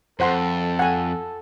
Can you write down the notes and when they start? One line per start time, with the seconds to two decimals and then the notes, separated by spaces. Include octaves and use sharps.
0.20 F2 A4 C5 F#5 C6
0.79 F#5 G#5